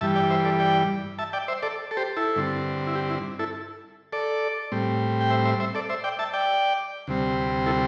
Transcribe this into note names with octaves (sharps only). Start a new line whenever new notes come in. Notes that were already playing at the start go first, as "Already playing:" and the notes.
G2 E3 G3 E5 A5
D5 G5
C5 E5
A4 D5
D5 G5
E5 A5
D5 G5
C5 E5
A4 D5
A4
G4 C5
E4 A4
G2 D3 C4
E4
G4
E4
E4 A4
A4 D5
A2 G3 C4
G5
C5 E5
C5 E5
C5 E5
A4 D5
C5 E5
D5 G5
E5 A5
D5 G5
D2 C3 G3 C4
E4 A4